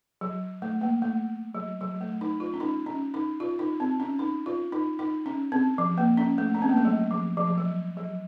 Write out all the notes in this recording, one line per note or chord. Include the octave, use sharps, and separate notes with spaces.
F#3
A3
A#3
A3
F#3
F#3
A3
D#4
F4
C#4
D#4
C#4
D#4
F4
D#4
C4
C#4
D#4
F4
D#4
D#4
C#4
C4
F3
A#3
C#4
A3
C#4
C4
A#3
A3
F#3
F3
F3
F3
F#3
F#3